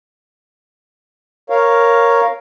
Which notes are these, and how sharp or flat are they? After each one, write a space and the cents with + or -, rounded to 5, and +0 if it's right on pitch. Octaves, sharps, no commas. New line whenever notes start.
A#4 +0 C#5 +0 F5 +0